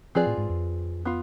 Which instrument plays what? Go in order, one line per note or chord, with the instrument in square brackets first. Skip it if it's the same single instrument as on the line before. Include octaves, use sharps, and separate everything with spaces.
[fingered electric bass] F3 [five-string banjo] C4 F4 G#4 B4 D5
[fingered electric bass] A2
G#2
F2
[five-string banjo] B3 F4